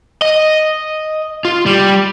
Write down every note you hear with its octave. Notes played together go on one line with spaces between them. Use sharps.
D#5
F4
G3